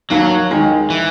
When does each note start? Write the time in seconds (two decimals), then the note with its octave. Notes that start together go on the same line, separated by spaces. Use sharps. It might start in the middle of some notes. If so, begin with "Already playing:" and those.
0.10 D#2 F#3
0.51 D#3 G#3
0.90 E3